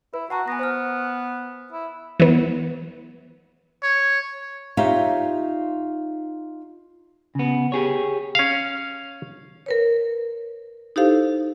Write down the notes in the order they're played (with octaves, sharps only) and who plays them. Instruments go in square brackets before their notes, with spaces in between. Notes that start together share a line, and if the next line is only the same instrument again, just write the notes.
[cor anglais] E4 [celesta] B4
[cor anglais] F#4 [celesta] F#5 A5 A#5
[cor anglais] B3 [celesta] G#5 A#6
[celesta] C5 G#5 F6
[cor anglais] E4
[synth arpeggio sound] E3 B3
[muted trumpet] C#5
[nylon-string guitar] D#4 F4 G4 C#5 E5 F5
[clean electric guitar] C#3 B3
G4 G#4 C#5
[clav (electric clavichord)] C#4 F5
[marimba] A#4 B4 C#5
D#4 E4 G4 A4 C5 F5